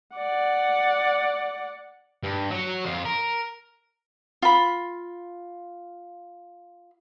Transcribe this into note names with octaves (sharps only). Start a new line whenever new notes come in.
D5 F#5
G2
F#3 C#5
F2 F4
A#4
F4 B5